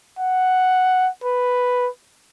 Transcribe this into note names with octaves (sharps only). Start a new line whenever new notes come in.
F#5
B4